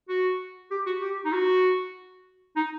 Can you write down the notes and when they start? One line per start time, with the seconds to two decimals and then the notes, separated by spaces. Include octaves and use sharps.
0.09 F#4
0.71 G4
0.86 F#4
1.01 G4
1.25 D#4
1.33 F#4
2.56 D#4